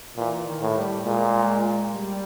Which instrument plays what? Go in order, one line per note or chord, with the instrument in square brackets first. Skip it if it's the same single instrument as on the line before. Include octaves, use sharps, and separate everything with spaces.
[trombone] A#2 [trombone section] E3
[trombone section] D#3
[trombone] A2
[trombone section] G3
[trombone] A#2 [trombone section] G#3
[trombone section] G3